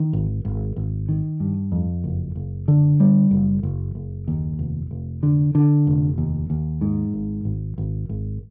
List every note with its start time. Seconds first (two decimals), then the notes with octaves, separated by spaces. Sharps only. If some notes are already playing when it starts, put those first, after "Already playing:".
Already playing: D#3
0.13 G#1
0.45 G#1
0.76 G#1
1.09 D#3
1.40 G2
1.72 F2
2.04 F#1
2.36 F#1
2.68 D3
3.00 G3
3.31 F#1
3.63 F#1
3.95 F#1
4.28 D#2
4.59 F1
4.91 F1
5.23 D3
5.55 D3
5.87 F1
6.18 D#2
6.50 D#2
6.81 G#2
7.14 G#1
7.45 G#1
7.78 G#1
8.09 G#1